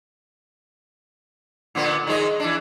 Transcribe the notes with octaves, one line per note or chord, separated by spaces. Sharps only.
A#2 D3 B3
D#3 G#3 D#5
E3 D4